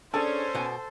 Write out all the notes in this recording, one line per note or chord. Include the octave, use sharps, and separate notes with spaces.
C#4 D4 G#4 A4 C5
B2 F#5 G#5